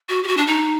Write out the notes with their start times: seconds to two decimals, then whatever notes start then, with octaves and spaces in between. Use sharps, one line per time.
0.09 F#4
0.24 G4
0.28 F#4
0.37 D4
0.47 D#4